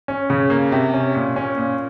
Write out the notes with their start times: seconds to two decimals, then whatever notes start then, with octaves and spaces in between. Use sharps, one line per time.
0.08 C#4
0.30 C#3
0.50 A#3
0.72 C3
0.94 C#4
1.15 A#2
1.36 C#4
1.58 A#2